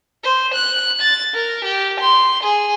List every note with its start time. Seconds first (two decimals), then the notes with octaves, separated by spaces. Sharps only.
0.24 C5
0.54 F#6
1.01 A6
1.34 A#4
1.65 G4
2.00 C6
2.43 G#4